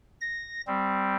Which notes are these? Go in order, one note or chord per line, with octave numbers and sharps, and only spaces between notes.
A#6
G3 C4